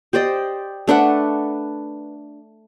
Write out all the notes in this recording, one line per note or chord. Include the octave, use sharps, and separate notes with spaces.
G4 C5 D5 D#5
A3 D4 B4 F#5